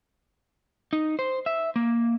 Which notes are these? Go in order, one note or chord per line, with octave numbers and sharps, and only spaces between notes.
D#4
C5
E5
A#3